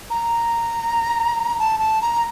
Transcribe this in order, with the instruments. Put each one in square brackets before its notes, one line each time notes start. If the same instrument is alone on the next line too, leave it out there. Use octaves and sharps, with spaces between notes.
[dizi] A#5
A5
A5
A#5